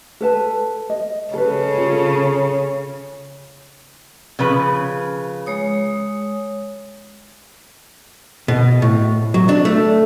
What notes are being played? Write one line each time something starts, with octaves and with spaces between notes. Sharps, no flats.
A4 B4 A5
D#5
C#3 A4 B4
F4 A4
C#3 F3 B4
G#3 C#5 D#6
B2
A2
F#3
D4
A3